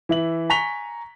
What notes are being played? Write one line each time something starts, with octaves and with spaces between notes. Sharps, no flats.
E3 E5 F#7
G#5 A#5 C#6 B6 F7 G7